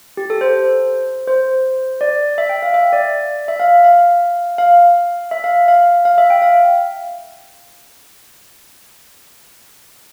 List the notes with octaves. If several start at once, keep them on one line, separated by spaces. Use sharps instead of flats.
G4
A4
C5
C5
D5
E5
G5
F5
E5
D5
E5
F5
F5
F5
E5
F5
F5
F5
E5
G5
F5